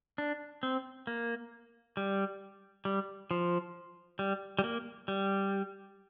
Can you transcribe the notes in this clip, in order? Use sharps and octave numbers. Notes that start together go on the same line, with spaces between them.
D4
C4
A#3
G3
G3
F3
G3
G3
A#3
G3